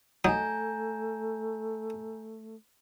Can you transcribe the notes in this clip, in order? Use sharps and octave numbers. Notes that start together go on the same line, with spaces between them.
F#3 A3 D#4 G#5 A#5 G6